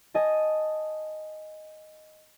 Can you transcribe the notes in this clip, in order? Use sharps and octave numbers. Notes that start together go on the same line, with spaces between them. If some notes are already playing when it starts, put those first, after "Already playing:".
D#5 G#5 A5